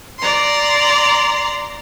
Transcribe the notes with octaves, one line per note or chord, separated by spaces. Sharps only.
D5 A#5 C6